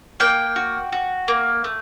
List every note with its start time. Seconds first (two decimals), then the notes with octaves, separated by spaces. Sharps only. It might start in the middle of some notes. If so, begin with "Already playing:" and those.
0.20 A#3 G5
0.56 F#4
0.92 F#4
1.28 A#3
1.64 A3